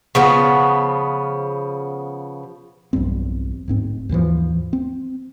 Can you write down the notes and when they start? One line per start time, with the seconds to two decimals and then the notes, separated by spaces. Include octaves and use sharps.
0.15 C#3 F3 B3
2.93 B1 E2 G2 C4
3.68 D1 G#2 C4
4.09 D#2 G#2 E3 F3
4.73 C4